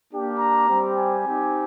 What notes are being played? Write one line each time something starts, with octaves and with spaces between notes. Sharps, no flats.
A#3 D4 G4
A#5
G3 C4 G4
G#5
C4 D#4 G4